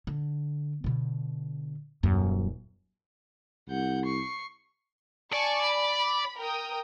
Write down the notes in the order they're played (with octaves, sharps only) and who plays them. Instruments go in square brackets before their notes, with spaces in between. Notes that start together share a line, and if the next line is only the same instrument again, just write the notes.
[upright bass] D3
B2 D3
D#1 F#2
[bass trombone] C2 [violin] F#5 G6
[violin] C#6 C7
[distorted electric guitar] D5 [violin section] G#5 A5 C#6
[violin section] B5
A#4 G5 D#6